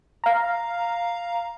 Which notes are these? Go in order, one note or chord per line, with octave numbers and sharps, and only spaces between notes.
F5 A#5